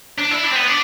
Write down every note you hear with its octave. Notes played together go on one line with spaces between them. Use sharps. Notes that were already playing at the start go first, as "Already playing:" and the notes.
D4
E4
D4
C4
B3
D4